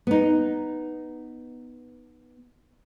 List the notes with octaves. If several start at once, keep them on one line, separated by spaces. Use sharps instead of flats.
B3 D#4